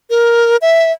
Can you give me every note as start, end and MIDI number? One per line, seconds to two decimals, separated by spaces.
0.10 0.57 70
0.62 0.92 76